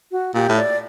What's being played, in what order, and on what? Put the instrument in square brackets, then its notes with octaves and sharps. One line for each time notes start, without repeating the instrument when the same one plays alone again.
[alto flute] F#4
[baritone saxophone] A#2 [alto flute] G4
[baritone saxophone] A2
[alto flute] D5